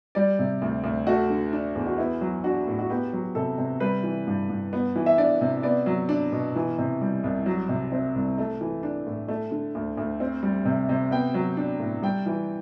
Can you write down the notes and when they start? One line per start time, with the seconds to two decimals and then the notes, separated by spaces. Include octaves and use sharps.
0.15 G3 D5
0.39 C3
0.62 D2
0.84 D2
1.07 A3 F#4
1.30 D3
1.53 D4
1.76 E2
1.87 F#4
1.98 B3 E4
2.21 F#3
2.44 D4 F#4
2.67 A2
2.79 F#4
2.90 B3 G4
3.13 F#3
3.35 C3 A4
3.58 C3
3.80 G3 B4
4.03 E3
4.27 G2
4.50 G2
4.73 B3
4.96 E3
5.06 E5
5.18 D4 D5
5.41 C3
5.63 B3 D5
5.86 F#3
6.09 D4
6.32 B2
6.56 E3
6.78 C3
7.01 G3
7.24 C2
7.46 F#3
7.69 C3
7.92 C4
8.15 C2
8.38 A3
8.61 E3
8.83 D4
9.07 A2
9.28 A3
9.51 D3
9.75 D2
9.97 D2
10.20 C4
10.43 G3
10.65 C3
10.89 C3
11.11 B3 G5
11.34 F#3
11.57 D4
11.80 A2
12.02 G3 G5
12.26 E3